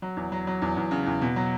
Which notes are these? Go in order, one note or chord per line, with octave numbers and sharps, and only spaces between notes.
F#3
E2
F#3
F#3
E2
E2
C#3
E2
B2
F#3